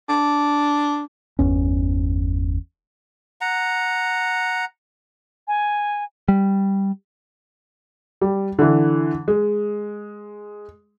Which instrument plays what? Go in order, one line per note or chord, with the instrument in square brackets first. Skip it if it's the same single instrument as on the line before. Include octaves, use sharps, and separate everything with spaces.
[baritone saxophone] D4
[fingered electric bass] G1 E2 C#4
[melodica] F#5 A#5
[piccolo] G#5
[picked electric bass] G3
[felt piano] G3
D3 E3
G#3